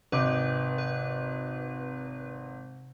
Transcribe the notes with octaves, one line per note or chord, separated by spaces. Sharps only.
G#1 C3 D#4 B4 D6 G6
B4